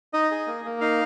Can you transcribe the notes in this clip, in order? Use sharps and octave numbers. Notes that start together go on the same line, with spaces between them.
D#4 D#5
G#4
A#3
A#3
D#4 F5